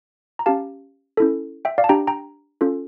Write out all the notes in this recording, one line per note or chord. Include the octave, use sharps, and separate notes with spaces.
A#5
C#4 G4 F5 A5
C#4 E4 A4
E5 G5
D5 F5
A5
D4 G4 G5 A#5
G5 A#5
C#4 F4 A4